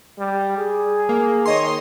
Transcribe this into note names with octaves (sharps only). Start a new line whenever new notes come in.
G3
G#4
A#3
D#3 C#5 D#5 C6